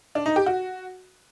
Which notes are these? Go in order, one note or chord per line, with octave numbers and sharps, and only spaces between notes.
D4
D#4
G4
F#4